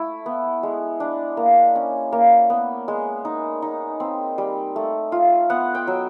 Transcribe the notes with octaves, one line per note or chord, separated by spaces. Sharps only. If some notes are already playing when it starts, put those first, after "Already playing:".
Already playing: A3 E4
B3
G#3
D4
A#3
C#4
A#3
B3
G#3
D#4
D#4
C4
G3
A3
F4
B3 F#5
G5
F#3